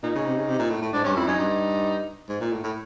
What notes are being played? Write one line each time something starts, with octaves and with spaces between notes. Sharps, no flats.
A#2 D#4
C#3
C3
C#3
C3
A#2
A2
A2
G#2 D4
G2 C#4
F2 E4
F#2 D#4
G2
G#2
A#2
A2
A2